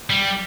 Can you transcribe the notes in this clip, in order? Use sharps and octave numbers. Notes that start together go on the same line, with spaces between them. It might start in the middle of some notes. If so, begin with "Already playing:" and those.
G3